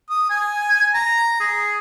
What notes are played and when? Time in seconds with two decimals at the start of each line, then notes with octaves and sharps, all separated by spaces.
0.10 D#6
0.30 G#5
0.94 A#5
1.40 G#4